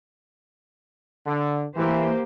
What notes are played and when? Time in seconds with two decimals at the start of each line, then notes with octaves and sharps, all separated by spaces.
1.26 D3
1.76 E3 A#3 G4 C5